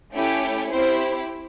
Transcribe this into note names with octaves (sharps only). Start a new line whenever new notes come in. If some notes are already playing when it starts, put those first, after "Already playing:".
A3 C#4 E4 G4
C4 E4 G4 C5